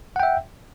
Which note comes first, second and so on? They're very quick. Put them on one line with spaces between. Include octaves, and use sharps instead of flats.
F#5 G5 E5